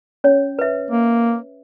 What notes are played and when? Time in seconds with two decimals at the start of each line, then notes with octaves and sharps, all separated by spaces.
0.24 C#4 C#5
0.59 B4 E5
0.91 A#3